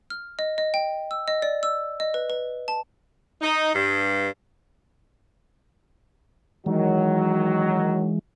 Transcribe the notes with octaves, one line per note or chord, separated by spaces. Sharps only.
F6
D#5
D#5
G5
E6
D#5
D5
E6
D#5
B4
B4
A5
D#4
G2
D#3 E3 F#3 G#3